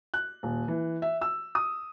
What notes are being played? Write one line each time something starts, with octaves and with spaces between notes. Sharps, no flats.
F#6
D#1
E3
E5
E6
D#6